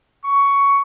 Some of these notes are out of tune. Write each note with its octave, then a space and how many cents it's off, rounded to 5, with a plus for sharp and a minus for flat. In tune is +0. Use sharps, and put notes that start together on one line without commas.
C#6 +10